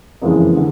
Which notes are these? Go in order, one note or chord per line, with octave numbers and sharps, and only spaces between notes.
F#1 F2 C#3 E3 G#3
D3